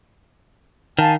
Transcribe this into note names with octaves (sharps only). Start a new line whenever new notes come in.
D#3 F5 G#5 A5